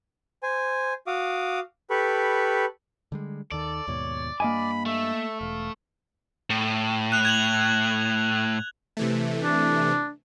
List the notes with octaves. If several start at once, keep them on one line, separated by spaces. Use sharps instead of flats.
C5 G#5
F#4 F5 D6 D#6
G4 A4 B4 B5 C#6
D3 G3 G#3
D#2 D#3 A4 D5
D#2 G#2 B2 C#5
G2 A#3 D#5 G#5 B5
A3 E5
E1 F5
A2
F#6 F7
G#6 F7 F#7
C3 E3 A3
D4